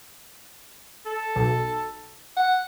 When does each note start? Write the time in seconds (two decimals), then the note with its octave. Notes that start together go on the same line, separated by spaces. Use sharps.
1.06 A4
1.36 B1
2.37 F#5